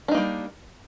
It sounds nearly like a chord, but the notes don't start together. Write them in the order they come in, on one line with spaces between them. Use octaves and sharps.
D4 D#4 A#3 G3